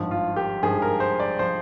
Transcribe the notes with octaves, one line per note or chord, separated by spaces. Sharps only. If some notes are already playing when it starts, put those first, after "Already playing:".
Already playing: G#1 G2 F3
F4
G4
G#1 G2 F3 G#4
A#4
C5
D5
F3 C5